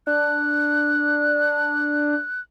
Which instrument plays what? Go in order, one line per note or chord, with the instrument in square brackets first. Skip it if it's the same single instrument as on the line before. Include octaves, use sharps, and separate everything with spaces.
[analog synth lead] D4 [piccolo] F#6